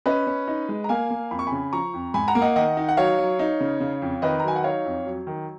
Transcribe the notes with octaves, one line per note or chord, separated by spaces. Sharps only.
C#4 B4 D#5
C#4
D#4
G#3
A#5
A#3 F5 G#5
A#3
F2 B5
C#6
C#3 G#5 B5
F3 A#5 C#6
F2
G#2 G#5 B5
F#5 A#5
A#3
D#5 F#5
D#3 D#5 F#5
D#4
F#5
F#3 C#5 F5
F#3
D#4
C#3
C#3
F2
D#3 B4 D#5
A#5
F#3 G#5
F#5
D#4 C#5 F5
F2
F#3
D#3